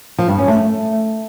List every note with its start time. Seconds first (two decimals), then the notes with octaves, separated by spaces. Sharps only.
0.18 F3
0.28 G2
0.38 C#4
0.48 A3